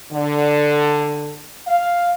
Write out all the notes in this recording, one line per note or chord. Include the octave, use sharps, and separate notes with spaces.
D3
F5